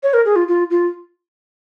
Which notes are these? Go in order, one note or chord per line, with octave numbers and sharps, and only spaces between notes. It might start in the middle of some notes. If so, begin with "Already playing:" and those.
C#5
A#4
G#4
F4
F4
F4